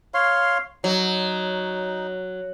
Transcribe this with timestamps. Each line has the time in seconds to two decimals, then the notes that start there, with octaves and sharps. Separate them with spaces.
0.14 C#5 F5 C6
0.84 F#3 D#4